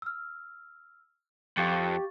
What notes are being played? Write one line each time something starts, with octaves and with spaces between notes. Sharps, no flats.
E6 F6
F2 G4 F5 C#6 A6